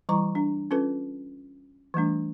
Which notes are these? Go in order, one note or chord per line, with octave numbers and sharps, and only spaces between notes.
E3 G3 E4 A#5 C#6
D4
C#4 F4 A4 B4
E3 G3 A3 D4